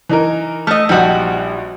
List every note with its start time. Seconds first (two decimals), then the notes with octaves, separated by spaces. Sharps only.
0.09 E3 D#4 A#4
0.67 A3 D#5 F6
0.89 A#1 F3 G3 D#4 F#4